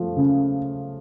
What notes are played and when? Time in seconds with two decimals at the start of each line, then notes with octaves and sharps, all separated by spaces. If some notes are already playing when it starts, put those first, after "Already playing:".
Already playing: F3 A3
0.17 C#3